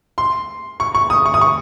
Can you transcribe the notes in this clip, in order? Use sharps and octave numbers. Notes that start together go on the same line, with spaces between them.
C6
C#6
C#6
D#6
C#6
D#6
C#6